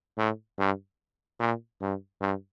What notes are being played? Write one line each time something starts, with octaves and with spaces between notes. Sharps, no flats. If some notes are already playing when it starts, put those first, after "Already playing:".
A2
G2
A#2
G2
G2